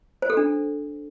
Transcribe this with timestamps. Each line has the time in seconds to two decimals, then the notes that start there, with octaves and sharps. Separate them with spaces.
0.22 C5
0.30 A4
0.37 D4